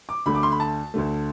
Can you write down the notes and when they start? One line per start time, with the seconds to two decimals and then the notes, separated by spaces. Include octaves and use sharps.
0.09 D6
0.26 D2 D3 A3 B5
0.35 D6
0.43 C6
0.52 B5
0.60 A5
0.94 D2 D3 A3